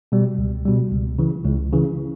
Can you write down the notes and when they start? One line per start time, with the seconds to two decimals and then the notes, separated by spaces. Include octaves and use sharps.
0.12 B2 G3
0.38 C#2
0.66 B2 G3
0.92 C#2
1.19 C#3 E3
1.45 C#2
1.73 C#3 E3